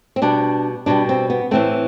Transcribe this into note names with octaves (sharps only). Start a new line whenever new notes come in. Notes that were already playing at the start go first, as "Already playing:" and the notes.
C4
B2 G3 D4
B2 G3 D4
C4
B3
A2 E3 A3 C4